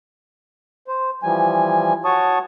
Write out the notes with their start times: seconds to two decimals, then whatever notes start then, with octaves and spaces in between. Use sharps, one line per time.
0.88 C5
1.23 E3 F3 G3 G#5
2.05 F#4 C#5 A5 C#6 D#6